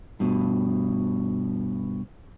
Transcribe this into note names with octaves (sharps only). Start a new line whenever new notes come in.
G2 B2